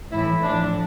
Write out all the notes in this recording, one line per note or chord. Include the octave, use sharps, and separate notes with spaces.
A2 E3 E4
A2 F3 D4